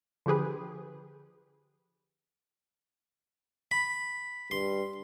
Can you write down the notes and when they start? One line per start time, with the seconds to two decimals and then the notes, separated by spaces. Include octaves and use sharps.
0.26 D3 F3 G4 G#4 B4
3.71 B5
4.51 G2 C6